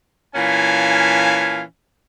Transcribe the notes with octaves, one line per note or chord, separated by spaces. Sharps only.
A#2 E3 C#4 F5 G#5 A5